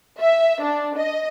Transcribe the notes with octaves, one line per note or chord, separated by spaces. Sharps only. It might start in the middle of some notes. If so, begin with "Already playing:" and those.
E5
D4
D#5